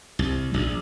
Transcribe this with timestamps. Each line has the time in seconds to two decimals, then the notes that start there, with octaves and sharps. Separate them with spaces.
0.19 C2
0.54 A#1